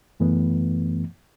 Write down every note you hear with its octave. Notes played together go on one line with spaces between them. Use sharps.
F#2 E3 A3 B3